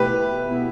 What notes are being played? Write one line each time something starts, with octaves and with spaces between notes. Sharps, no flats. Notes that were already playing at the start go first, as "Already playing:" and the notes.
Already playing: B2 A3 E4 G4 B4
B2 B3 E4